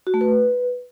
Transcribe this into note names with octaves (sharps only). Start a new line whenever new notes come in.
F#4
A3
B4